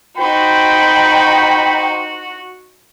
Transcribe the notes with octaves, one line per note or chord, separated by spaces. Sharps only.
D#4 F#4 C5 G5 B5